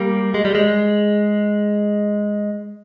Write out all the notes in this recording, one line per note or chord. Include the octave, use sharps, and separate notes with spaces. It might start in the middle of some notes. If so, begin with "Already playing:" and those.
Already playing: G3 A#3
G#3
G3
G#3